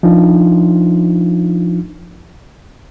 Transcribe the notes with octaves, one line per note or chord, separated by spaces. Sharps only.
F3 D4 D#4 F4